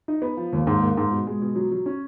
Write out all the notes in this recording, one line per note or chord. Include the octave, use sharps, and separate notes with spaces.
D#4
B3
F3
D#2
G#2
A#3
G#2
B2
G#3
B2
F#3
F#3
C#4